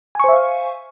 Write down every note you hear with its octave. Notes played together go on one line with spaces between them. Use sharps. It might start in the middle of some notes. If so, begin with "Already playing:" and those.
C5 E5 F5 G#5 C#6